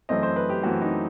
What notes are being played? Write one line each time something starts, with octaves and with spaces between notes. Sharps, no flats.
F#2 E3 A3 C4 D#5
C5
B4
G4
F#2 E3 A3 C4 F#4
D#4